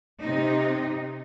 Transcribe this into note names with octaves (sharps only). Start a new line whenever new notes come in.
C3 D#4